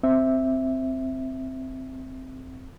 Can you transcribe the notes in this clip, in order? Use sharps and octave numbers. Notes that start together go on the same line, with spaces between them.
C4 E5